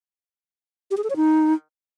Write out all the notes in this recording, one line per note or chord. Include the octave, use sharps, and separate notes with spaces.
G4
G#4
A4
C#5
D#4